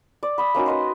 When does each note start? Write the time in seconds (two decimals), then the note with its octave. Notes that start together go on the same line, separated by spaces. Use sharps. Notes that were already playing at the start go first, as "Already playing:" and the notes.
0.23 D5
0.38 B5 D#6 E6
0.55 A#3 C#4 D#4 F#4
0.66 B4 D#5 C6